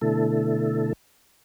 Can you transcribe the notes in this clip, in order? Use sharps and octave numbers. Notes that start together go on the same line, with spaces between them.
B2 D3 A3 E4 A4